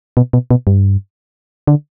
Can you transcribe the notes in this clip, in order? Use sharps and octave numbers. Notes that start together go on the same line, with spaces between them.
B2
B2
B2
G2
D3